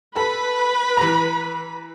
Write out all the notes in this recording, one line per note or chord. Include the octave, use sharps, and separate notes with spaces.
A4 B4 B5
E3 A#5